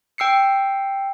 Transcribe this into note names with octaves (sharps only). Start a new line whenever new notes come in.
G5 E6 C7 C#7